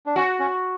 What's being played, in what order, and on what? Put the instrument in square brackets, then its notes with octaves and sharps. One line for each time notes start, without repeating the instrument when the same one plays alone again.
[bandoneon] D4
[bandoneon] C#4 [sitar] F#4
[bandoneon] C#4